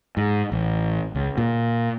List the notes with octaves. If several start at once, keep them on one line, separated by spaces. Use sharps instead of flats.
G#2
A1
C#2
A#2